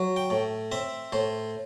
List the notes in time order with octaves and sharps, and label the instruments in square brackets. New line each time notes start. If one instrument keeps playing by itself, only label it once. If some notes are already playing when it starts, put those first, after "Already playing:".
Already playing: [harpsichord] F#3
G5
A2
C4 E5
A2 C5